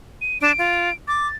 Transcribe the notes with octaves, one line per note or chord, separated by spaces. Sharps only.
D#7
D4 D7
F4
D6 A6